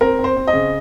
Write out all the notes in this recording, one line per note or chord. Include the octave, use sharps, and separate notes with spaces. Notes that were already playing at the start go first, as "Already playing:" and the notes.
C4 A#4
C4
C5
C4
D#5
C#3